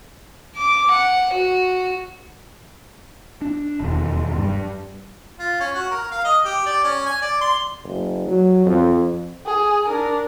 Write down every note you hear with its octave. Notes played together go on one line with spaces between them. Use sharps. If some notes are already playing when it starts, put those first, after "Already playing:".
D6
F#5
F#4
D4
E1 D#2
G2 G3
F4
C#4
F#4
A#4
F5
D#5
G4
D5
C#4
G#5
D5
C6
F#1
F#3
F2
G#4
D4 A#4